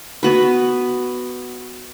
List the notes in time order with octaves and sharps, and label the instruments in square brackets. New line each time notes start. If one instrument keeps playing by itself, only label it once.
[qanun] B3 F#4 B4